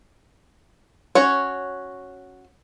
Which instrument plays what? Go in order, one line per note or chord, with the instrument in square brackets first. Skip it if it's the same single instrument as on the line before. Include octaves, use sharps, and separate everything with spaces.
[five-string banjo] C#4 F#4 C#5